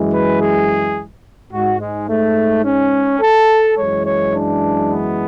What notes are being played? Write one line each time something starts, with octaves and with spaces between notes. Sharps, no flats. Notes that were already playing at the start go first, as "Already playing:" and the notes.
Already playing: F#2 E3 G#3
B4
G#4
G#2 G#3 F#4
G#3
A3
C#4
A4
F#2 E3 G#3 C#5
C#5
D4
B3